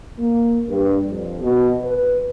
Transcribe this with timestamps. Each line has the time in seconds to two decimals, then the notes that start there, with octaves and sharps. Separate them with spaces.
0.18 A#3
0.68 G2
1.07 F2
1.41 B2
1.84 B4